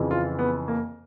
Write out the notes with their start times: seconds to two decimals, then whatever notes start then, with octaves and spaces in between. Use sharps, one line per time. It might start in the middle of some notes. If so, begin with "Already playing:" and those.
Already playing: F2 C#3 E3
0.11 F4
0.39 B3
0.68 A#3